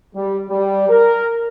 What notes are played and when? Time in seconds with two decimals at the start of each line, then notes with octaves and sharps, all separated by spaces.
0.16 G3
0.49 G3
0.89 A#4